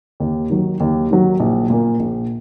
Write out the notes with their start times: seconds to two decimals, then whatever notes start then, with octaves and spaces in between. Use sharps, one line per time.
0.20 D#2
0.49 D#3 F#3
0.80 D#2
1.10 D#3 F#3
1.40 A#1
1.70 A#2 A#3
1.99 A#1